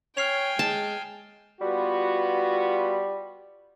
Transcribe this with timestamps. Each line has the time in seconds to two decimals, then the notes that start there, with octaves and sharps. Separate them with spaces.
0.17 C#5 G5 G#5 F6 C7 F7
0.59 G#3 A5
1.61 G3 B3 F4 F#4